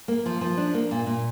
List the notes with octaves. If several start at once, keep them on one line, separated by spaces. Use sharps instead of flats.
A#3
F3
F3
D4
A#3
A#2
A#2